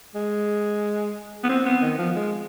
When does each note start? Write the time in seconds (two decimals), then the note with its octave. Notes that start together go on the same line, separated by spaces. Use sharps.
0.15 G#3
1.44 B3
1.49 C4
1.66 B3
1.82 D#3
1.98 F3
2.16 G#3